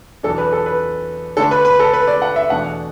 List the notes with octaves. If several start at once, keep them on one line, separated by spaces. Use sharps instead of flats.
E2 B2 F#3 D4 A4
B4
A4
B4
D3 A3 D4 A4
B4
B4
A4
B4
D5
F#5
E5
E2 B2 A3 D4 F#5